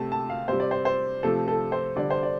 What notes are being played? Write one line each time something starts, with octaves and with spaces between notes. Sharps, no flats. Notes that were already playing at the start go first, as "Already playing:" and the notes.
Already playing: C3 A3 A5
A5
F5
C3 G3 C5
D5
C5
C5
C3 F3 A3 A4
A4
C5
D3 G3 D5
C5
D5